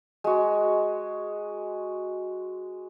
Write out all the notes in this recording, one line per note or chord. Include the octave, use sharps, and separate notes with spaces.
G#3 F#4